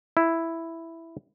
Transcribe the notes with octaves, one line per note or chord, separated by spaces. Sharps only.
E4